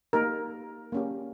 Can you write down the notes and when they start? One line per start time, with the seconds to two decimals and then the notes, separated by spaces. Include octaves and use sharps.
0.13 A#3 D#4 G4 A#4
0.92 A#3 C#4 G4